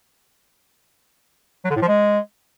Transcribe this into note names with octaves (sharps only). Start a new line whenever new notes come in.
F#3
D3
A2
F3
G#3